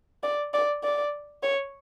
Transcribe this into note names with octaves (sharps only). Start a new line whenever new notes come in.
D5
D5
D5
C#5